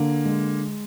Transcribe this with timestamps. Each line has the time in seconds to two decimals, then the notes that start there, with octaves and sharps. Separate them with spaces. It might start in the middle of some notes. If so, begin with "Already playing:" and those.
Already playing: D3 A#3
0.25 G#3